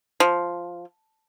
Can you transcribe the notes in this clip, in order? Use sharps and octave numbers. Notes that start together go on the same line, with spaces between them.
F3